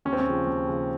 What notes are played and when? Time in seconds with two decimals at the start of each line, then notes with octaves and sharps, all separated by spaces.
0.05 D#2 C#4
0.13 C4
0.19 C#4
0.26 C#3 F3
0.47 D#2
0.67 C#3 F3